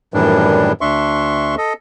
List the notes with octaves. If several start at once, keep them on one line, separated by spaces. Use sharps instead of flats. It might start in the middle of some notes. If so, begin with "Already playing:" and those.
F#2 A2 D#3 E3 G3 D4
D2 D4 E5 C6 C#6
A4 D#5